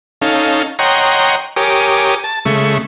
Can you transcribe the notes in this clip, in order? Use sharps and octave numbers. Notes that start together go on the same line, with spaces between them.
C#4 D#4 A4 F5
C#5 D#5 F#5 G5 A#5 C6
G4 A#4 C#5 G#5 D6 D#6
A5
C#3 G#3 A3 E5 C#6